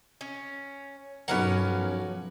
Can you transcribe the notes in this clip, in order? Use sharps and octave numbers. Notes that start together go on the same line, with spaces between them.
C#4
B1 G2 F3 F#3 B3 C#4 A#4 F#5